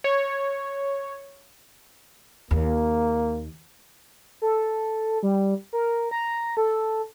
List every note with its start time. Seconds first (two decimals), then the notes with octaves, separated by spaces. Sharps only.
0.04 C#5
2.51 D#2 A#3
4.42 A4
5.23 G3
5.73 A#4
6.11 A#5
6.57 A4